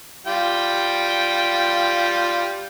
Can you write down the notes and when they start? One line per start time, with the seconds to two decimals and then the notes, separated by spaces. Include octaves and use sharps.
0.27 G3 F4 G5